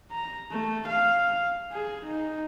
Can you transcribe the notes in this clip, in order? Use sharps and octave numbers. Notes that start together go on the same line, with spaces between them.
A#5
A3
F5
G#4
D#4